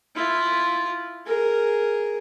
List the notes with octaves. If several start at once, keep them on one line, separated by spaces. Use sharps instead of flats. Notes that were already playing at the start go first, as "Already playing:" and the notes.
E4 F4
G#4 A#4